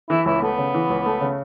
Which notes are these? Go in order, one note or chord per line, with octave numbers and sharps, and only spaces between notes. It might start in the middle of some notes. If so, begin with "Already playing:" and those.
E3 E4
C#2 E4
A3 B3
C#3
E3
C#2
A3
C#3